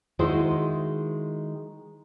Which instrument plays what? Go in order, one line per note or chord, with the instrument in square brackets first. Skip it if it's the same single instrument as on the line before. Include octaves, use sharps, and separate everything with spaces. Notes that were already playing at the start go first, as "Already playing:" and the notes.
[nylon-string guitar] D#3 G#3 E4 F#4 C5